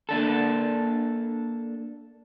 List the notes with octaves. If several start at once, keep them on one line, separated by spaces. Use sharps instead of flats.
A#3 D4 A4